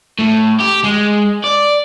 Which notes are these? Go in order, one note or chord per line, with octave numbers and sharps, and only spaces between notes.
A2
G4
G#3
D5